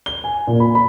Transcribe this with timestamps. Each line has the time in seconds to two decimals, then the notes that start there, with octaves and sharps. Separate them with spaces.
0.06 G7
0.24 G#5
0.47 A#2
0.60 B5
0.75 B5